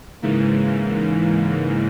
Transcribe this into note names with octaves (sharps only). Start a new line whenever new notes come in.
G#2 C#3 E3 A#3